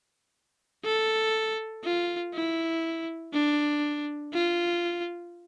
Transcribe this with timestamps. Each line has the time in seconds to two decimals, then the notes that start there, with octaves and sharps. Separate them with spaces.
0.85 A4
1.84 F4
2.34 E4
3.33 D4
4.33 F4